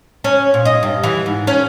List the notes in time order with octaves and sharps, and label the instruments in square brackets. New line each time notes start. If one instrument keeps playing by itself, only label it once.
[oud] C#4
A#2
D#5
G2
E3
G#2
C#4